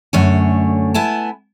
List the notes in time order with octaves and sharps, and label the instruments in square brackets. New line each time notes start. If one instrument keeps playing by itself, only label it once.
[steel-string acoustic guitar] F#2 D3 A3 C#5 G#5
B3 E4 G#5 A5